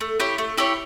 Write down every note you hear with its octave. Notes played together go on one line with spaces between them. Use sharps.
A3
E4 G4 C#5
A3
E4 G4 C#5